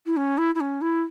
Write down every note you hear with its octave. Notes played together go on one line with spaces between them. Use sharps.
E4
C#4
E4
E4
C#4
E4